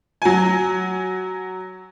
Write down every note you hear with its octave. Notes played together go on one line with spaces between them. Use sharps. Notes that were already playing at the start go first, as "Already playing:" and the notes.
F#3 G#5